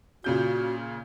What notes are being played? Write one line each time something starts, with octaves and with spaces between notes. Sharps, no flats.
A#2 C#3 F#4 G6